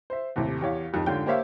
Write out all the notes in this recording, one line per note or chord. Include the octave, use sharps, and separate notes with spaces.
C5 E5
D#2 A2 C3
E2 G4 C#5 F5
D#1 F2 D#3
G#2 D3 F4 C#5 G5 G6
A#3 G4 C5 C#5 E5 F5